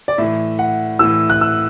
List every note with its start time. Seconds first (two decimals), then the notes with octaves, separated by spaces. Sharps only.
0.08 D5
0.18 A2 E3 E5
0.59 F#5
0.99 A2 E3 E6
1.30 F#6
1.41 E6